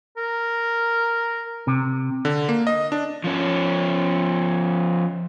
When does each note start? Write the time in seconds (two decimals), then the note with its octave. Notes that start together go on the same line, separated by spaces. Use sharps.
0.17 A#4
1.67 C3
2.25 D3
2.49 A#3
2.67 D#5
2.92 D4
3.24 F3 C#4